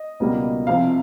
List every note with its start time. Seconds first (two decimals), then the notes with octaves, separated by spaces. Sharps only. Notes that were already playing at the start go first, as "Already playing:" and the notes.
Already playing: D#5
0.20 C#2 B2 G3 A#3
0.67 C2 C3 F3 F5